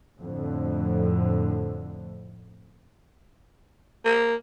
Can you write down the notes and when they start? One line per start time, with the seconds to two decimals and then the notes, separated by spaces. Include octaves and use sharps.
0.19 F2 A2 D3
4.05 A#3